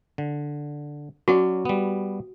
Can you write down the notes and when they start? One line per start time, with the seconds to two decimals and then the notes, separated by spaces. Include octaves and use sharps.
0.18 D3
1.28 F#3 C#4 F#4 D5
1.65 G3 B3